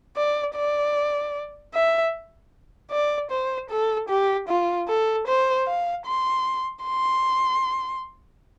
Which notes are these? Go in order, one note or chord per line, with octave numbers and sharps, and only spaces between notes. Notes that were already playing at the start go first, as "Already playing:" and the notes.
D5
D5
E5
D5
C5
A4
G4
F4
A4
C5
F5
C6
C6